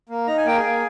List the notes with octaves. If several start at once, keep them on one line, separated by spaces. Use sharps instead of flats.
A#3
D#4 A#5
G#5
A#3 G5
G#4 G#5
A#3